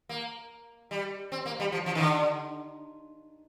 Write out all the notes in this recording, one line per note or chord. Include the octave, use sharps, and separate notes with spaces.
A#3
G3
C4
A#3
G3
F3
F3
D#3
D3